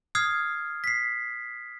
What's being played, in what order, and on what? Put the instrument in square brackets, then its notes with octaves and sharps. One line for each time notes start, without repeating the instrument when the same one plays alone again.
[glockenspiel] D#6 F6 G#6 C7
B6 C7